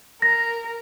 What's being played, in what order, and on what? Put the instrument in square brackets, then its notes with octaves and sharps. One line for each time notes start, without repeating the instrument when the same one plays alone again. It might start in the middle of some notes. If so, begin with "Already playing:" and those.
[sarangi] A#4 [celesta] A#6